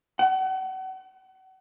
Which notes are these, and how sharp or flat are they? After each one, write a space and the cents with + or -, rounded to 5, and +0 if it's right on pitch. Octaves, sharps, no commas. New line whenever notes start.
F#5 +35